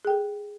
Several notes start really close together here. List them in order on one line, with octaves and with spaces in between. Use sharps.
G#4 G5 A4